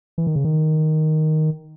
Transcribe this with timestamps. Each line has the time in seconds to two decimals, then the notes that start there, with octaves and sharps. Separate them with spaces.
0.18 E3
0.27 D#3
0.35 C#3
0.45 D#3